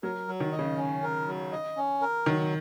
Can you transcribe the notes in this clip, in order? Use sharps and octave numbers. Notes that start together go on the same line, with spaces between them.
F#3 A#4
F#3
D#3
D#5
C#3
C#4
A#4
F#3
D#5
C#4
A#4
D#3 F#3